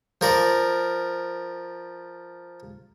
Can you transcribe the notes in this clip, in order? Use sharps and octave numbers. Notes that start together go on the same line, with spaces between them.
F3 A#4 D5